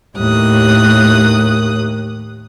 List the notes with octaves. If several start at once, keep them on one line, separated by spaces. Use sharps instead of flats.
D#2 A2 A#3 G4 D#6 F#6